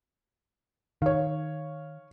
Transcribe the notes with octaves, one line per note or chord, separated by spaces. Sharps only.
D#3 C#5 F5